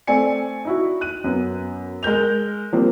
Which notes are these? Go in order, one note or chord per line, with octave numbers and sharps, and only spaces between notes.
A3 C4 D5 G#5 C#7
D#4 E4 F#4
F#6 D#7
F#2 B3
G#3 A#4 G6 F7
F3 G3 A#3 C4